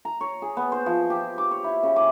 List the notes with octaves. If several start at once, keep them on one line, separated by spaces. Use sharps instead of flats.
A#5
C#5
G#4
B3
C5
F3
G4
D6
C#5
E4
C#3
D6